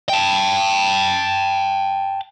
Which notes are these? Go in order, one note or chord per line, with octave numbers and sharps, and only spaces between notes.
G5 A5